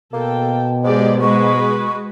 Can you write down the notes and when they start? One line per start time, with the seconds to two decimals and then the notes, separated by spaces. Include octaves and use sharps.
0.13 B2 A#3 A4 G5
0.84 G#2 G#3 G4 D5
1.21 G#3 F#4 B4 C#6